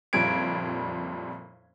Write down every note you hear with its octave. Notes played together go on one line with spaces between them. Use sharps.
F#1 F2 A#2 G3 G#6 D7